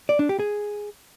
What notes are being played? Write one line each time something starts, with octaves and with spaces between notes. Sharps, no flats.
D5
D4
G4
G#4